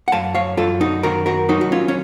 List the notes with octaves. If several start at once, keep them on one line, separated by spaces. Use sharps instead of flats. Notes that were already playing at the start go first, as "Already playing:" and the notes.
F#5
F#2 F5 A5
C#5 F5
F#2 F4 A4
D#4 F#4
D#3 F#4 A#4
F#4 A#4
F#3 D#4 F#4
F#4
C#4 F4
C#4